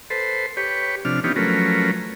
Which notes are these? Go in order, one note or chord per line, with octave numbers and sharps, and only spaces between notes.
A4 B4 C5
G4 B4 C#5
C3 F3 D4 F6
E3 B3 C#4 D#4 F4 G4
F3 F#3 A3 C#4 A#4 B4